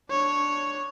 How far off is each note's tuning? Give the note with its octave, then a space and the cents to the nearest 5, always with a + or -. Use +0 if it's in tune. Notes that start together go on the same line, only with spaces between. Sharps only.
D4 +0 C#5 +0